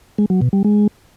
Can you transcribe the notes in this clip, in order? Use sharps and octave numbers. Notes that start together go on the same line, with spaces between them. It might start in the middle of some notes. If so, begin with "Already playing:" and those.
G#3
F#3
B2
G3
G#3